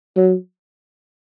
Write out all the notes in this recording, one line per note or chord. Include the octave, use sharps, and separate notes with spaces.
F#3